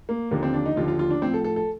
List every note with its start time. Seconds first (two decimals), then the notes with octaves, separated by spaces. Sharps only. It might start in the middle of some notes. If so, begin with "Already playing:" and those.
0.09 A#3
0.31 D#2 D3 F3 A#3
0.43 C4
0.54 D4
0.66 D#4
0.76 D#2 D3 F3 F4
0.88 F4
0.99 F4
1.11 D4
1.22 A2 F3 C4
1.34 A4
1.44 A4
1.56 A4